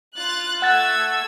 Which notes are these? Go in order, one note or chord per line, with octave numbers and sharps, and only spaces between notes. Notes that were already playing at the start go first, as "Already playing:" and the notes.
F4 F#6 A6
A3 F#5 E6 F#6 G#6 A6